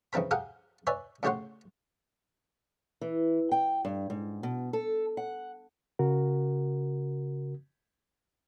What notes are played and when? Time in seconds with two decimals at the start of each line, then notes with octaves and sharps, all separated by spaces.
0.13 C#3 E3 C4 A#4 B5
0.31 G4 G#4 A#4 F5 F#5
0.87 B4 C#5 D5 E5 G#5
1.23 A2 C#3 G4 C#5 F#5 C6
3.01 E3
3.52 G5
3.85 G2
4.10 G#2
4.43 B2
4.73 A4
5.17 F#5
5.99 C#3 F#4 A#4